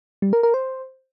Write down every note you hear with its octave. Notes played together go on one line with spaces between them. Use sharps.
G3
A#4
A#4
C5